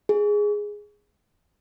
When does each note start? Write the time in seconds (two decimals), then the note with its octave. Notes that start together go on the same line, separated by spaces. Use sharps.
0.09 G#4